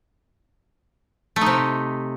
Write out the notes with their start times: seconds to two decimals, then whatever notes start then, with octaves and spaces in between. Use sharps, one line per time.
1.36 A3
1.41 D#4
1.46 C3